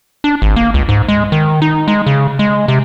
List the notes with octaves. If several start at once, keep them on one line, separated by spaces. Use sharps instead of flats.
D4
G#1
A#3
C#2
G#2
G#3
D#3
D#4
G#3
C#3
G#3
C3